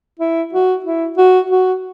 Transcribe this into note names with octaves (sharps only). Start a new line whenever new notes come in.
E4
F#4
E4
F#4
F#4